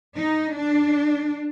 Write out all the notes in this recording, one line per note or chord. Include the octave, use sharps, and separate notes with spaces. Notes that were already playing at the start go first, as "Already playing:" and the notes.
D#4
D4